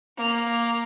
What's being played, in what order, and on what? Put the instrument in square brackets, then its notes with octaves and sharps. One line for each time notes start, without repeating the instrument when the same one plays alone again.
[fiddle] A#3